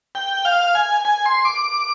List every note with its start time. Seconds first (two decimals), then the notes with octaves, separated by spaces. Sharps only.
0.15 G5
0.45 F5
0.75 G#5
1.05 G#5
1.26 C6
1.45 D6